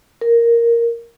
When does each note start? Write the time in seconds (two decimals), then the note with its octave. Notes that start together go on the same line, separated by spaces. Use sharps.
0.21 A#4